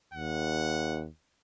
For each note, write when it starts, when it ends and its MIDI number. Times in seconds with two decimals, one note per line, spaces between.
0.14 1.08 39
0.14 1.03 78